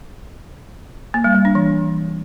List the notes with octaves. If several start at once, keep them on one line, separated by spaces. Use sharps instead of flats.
A#3
G3
G3
D4
E3